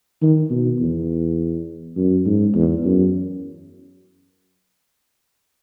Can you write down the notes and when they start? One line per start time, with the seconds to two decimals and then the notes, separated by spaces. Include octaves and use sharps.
0.22 D#3
0.51 B2
0.80 E2
1.97 F#2
2.26 G#2
2.55 E2
2.85 F#2